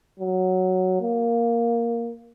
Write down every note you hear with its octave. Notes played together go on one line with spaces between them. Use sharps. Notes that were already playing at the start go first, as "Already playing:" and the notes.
F#3
A#3